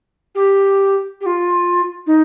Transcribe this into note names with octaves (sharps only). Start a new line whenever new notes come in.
G4
G4
F4
D#4